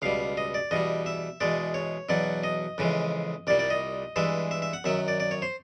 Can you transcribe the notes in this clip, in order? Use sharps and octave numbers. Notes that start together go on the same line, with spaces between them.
C#2 B2 G3 F5
D#5
D5
E2 B2 G3 D#5
E5
E2 B2 G#3 D5
C#5
E2 B2 F#3 D5
D#5
F2 C#3 E3 G#3
C2 A#2 G3 D5
D5
D#5
G2 E3 G#3 E5
E5
E5
F#5
F#2 D#3 F#3 E5
D5
D5
C#5
C5